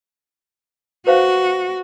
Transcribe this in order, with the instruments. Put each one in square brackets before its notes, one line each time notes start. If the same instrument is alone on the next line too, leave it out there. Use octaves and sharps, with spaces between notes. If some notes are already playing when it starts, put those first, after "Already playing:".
[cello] F#4 [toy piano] B4 C5 F5